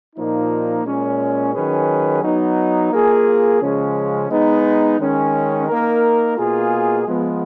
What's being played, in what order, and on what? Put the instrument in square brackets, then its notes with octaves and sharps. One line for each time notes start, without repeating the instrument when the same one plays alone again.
[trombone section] A#2 F3 A#3 D#4
A#2 G#3 C#4
D#3 F#3 C#4 G#4 B4
F#3 B3 D#4
A#3 F4 G#4
C#3 F3 G#3 C#4
G#3 B3 D#4
D#3 G#3 C#4
A#3 D#4 A#4
B2 A#3 F4 G#4
F3 G#3 B3